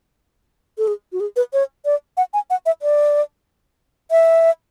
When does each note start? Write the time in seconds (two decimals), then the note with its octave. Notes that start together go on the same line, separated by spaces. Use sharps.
0.78 A4
0.87 G#4
1.12 F#4
1.20 G#4
1.36 B4
1.53 C#5
1.85 D5
2.17 F#5
2.33 G#5
2.50 F#5
2.66 E5
2.82 D5
4.11 E5